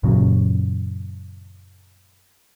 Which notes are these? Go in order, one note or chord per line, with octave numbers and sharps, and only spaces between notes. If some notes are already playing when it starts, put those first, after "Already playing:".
F#2 A#2 C#3 F#3